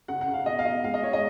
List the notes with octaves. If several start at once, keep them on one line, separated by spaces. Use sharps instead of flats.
C#3 F#5
F#5
C#3
F5
B2 D#5
F5
B2 D#5
G#3 F5
D#5
G#3 C#5
D#5